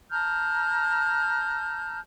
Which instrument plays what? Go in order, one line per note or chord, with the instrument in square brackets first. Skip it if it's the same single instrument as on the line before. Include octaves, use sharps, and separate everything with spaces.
[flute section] A5 A#5 F6 G6